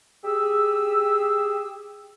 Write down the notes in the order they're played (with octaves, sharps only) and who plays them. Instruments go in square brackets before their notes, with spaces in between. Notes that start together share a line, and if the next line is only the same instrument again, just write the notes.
[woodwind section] G4 G#4 E6